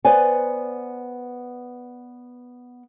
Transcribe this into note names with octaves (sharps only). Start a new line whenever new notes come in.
B3 B4 C5 D5 G#5